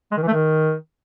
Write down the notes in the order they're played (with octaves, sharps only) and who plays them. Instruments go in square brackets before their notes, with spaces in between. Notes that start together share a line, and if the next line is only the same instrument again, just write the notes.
[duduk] G#3
D#3
E3
A3
D#3